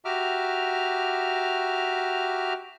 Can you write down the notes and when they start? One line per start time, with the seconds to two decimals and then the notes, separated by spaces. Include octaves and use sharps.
0.05 F#4 G4 E5 A#5 D6 F6